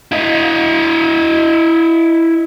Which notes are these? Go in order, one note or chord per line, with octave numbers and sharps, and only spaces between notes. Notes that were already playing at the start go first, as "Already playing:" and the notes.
E4 D#5